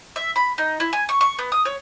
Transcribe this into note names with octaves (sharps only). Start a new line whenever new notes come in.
E5
B5
D#4
E4
G#5
C#6
C#6
B3
D#6
C#5